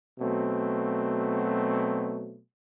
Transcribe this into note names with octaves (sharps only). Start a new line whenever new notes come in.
B2 F#3 A3 C4